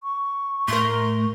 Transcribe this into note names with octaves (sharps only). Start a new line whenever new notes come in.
C#6
A2 A3 A#4 C6